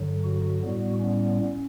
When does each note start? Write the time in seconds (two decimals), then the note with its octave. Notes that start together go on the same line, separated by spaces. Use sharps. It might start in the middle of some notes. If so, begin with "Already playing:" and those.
Already playing: G2 D3 F#3
0.24 F#4
0.62 A2 G3 B3
1.00 C#4